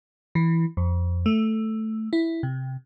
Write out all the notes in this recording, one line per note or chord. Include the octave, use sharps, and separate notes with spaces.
E3
F2
A3
E4
C3